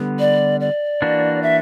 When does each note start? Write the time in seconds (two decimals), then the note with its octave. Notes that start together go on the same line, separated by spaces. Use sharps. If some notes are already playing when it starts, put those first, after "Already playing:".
Already playing: D3 G3 B3
0.19 D5
0.60 D5
1.02 E3 A#3 D4 F#4
1.42 E5